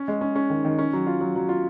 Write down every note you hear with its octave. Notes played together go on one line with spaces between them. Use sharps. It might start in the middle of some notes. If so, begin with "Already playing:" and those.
Already playing: C#4
G#3
C#4
C#4
D#3
D#3
C#4
F#3
F4
F#3
F#3
F4